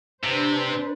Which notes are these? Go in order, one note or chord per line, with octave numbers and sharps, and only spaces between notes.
C3 D4 B4 C5